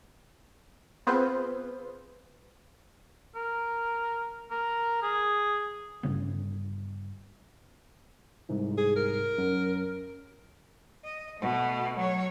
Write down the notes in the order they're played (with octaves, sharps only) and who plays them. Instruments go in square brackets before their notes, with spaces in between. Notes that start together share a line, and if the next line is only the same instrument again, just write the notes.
[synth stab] B3 C4 F4 G#4 B4 C5
[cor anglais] A#4
A#4
G#4
[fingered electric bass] G1 G2 C#3 B3
[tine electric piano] C2 G#2
[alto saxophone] G#4
A#4
[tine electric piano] F#2
[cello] D#5
B2 A3
F#3 C#5